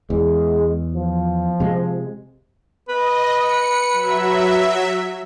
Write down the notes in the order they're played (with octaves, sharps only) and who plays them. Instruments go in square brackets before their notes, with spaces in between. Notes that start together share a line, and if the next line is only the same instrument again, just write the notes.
[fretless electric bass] E2 [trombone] G#3
[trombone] F3
[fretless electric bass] C3 G#3
[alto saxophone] B4 [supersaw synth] D#5
[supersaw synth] C#7
F#3 E5